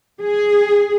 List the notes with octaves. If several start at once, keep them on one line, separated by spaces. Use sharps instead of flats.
G#4